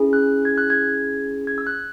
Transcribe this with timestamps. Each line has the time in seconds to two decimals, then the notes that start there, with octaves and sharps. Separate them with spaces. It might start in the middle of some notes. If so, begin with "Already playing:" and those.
Already playing: C#4 E4 G#4
0.13 F#6
0.45 G#6
0.58 F#6
0.70 G#6
1.47 G#6
1.58 E6
1.67 F#6